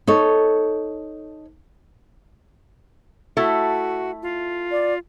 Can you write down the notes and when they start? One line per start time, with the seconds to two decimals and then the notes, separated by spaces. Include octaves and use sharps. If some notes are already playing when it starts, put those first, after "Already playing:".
0.07 D#4 A4 C#5
3.37 A3 E4 F#4 A4
4.23 F4
4.71 D5